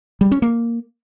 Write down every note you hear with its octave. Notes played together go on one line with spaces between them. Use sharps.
G3
C#4
A#3